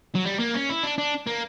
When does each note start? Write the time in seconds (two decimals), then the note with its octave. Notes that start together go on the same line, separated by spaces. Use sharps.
0.15 F#3
0.25 G3
0.39 A#3
0.54 C#4
0.69 E4
0.83 D4
0.98 D4
1.27 A#3